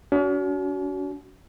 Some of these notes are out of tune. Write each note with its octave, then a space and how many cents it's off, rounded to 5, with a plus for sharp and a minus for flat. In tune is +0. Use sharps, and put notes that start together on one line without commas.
C#4 +45 F#4 +15